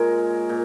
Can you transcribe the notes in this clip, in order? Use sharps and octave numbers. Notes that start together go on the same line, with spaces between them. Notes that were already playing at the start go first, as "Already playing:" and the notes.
Already playing: A#2 G#3 A#4 C#5
A#2